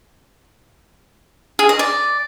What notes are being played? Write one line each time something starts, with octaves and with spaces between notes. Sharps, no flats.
G#4
D#5
D5